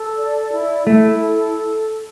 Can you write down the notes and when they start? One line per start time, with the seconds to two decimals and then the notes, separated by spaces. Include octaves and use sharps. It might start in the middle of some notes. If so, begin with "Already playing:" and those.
Already playing: A4
0.18 D5
0.52 E4
0.86 A3 E4
1.20 A4